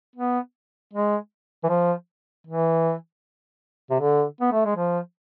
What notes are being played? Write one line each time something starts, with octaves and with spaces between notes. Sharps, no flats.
B3
G#3
E3
F3
E3
C3
D3
B3
A3
G#3
F3